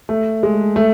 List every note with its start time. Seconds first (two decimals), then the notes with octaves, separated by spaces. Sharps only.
0.09 A3
0.43 G#3
0.76 A3